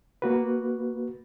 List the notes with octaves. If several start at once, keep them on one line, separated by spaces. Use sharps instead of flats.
A#3 F#4 B4